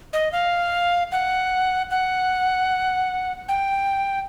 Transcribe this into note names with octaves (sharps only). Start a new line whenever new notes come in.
D#5
F5
F#5
F#5
G5